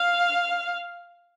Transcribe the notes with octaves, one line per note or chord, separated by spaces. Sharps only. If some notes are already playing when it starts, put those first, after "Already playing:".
Already playing: F5